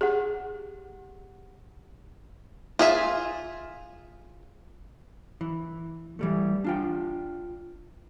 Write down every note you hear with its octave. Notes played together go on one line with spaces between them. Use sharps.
G4 G#4 F#5
F4 G#4 E5
E3
E3 G3 A3
D4 F4 G5